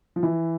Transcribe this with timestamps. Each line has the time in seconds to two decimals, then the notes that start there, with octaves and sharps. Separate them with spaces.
0.16 F3
0.23 E3